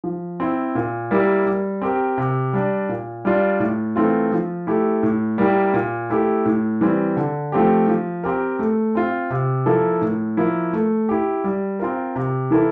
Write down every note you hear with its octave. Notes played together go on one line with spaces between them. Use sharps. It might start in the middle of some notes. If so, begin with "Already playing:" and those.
F3
C4 E4
A#2
G3 A#3 E4 G4
G3
C4 G4 A#4
C3
G3 D4
A#2
G3 D4 F4
A2
E3 A3 C4 F4
F3
A3 E4 G4
A2
G3 A#3 E4 G4
A#2
A3 E4 G4
A2
E3 G3 C4
D3
F3 A3 C4 G4
F3
C4 G4 A#4
A3
C4 F4
C3
F3 A#3 E4 A4
A2
F3 A#3 E4
A3
E4 G4
G3
C4 F4 A#4
C3
E3 A#3 E4 A4